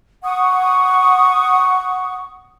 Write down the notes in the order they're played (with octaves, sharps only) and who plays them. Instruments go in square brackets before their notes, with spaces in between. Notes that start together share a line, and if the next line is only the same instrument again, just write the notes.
[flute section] F#5 C#6 D#6